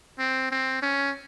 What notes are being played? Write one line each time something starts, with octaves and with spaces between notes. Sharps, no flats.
C4
C4
C#4